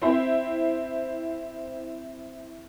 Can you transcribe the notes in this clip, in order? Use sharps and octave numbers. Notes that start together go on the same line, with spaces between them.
C4 E4 C5